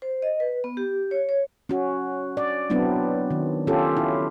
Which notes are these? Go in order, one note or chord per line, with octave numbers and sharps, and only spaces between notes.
C5
D#5
B4
B3
G4
C#5
C#5
C#4 F#4
D5
F#3 B3 C4 D4 E4
D#3
C#4 F4 G4 A4
E4